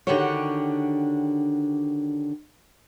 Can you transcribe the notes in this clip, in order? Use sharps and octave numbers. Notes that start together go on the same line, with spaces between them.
D3 D#3 D4 F#4 G4 C#5